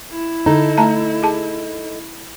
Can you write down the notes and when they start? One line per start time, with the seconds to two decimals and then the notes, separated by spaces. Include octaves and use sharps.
0.12 E4
0.46 D3 D#4 A4
0.78 A3 A5 A#5
1.23 G#4 A5